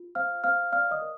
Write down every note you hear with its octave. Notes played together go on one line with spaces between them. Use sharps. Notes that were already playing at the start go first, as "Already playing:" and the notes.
Already playing: F4
C5 F5 F6
C5 F5 F6
D5 F5 F6
D#5 D#6
A#4